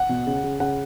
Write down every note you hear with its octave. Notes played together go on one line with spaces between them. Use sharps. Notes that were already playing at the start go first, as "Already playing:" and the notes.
Already playing: F#5
B2
C#3
C#3
C#3 F#5